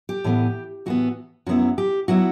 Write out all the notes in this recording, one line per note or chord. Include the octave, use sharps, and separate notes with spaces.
G4
A2 E3 B3
A2 E3 B3 F#4
F#2 F#3 B3 E4 F#4
G4
F#3 B3 E4 F#4